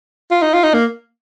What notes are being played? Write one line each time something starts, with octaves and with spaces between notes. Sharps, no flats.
F4
D#4
F4
D#4
A#3